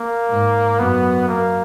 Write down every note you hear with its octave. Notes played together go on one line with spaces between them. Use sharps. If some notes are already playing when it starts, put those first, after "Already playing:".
Already playing: A#3
G#2
F#2 B3
A#3